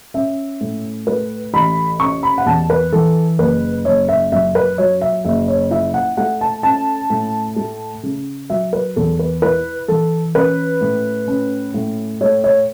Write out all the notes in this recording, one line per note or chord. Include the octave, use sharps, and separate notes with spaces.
C#4 E5
A2
A3 B4
A1 B5
C#4 C#6
B5
F#5
E2 A5
B4
E3 A4
F#1 B4
F#1 C#5
E5
F#2 E5
B4
F#3 C#5
E5
F#1 E5
C#5
E4 E5
F#5
A3 F#5
A5
C#4 A5
A2
A3
C#3
F#3 E5
B4
E2 A4
B4
E4 B4
E3 A4
C#4 B4
A2
C#4
A2
A3 C#5
C#5